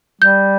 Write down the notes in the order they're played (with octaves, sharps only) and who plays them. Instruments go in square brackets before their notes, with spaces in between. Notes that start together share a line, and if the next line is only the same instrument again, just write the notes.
[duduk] G3 [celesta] G6